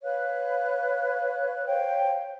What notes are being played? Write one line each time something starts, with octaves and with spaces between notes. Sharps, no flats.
B4 C#5 F5 F#6
C5 C#5 F5 G5